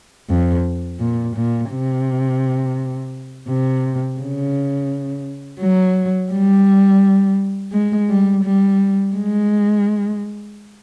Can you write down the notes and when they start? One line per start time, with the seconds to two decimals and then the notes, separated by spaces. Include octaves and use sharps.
0.29 F2
1.00 A#2
1.36 A#2
1.71 C3
3.48 C3
4.19 C#3
5.60 F#3
6.32 G3
7.73 G#3
8.09 G3
8.44 G3
9.15 G#3